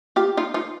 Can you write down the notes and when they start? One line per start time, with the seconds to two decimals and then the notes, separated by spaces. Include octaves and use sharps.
0.16 F4 G4
0.37 D#4 F4
0.54 D#4 F4